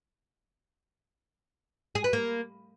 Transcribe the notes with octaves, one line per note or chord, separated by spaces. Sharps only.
G#4
B4
A#3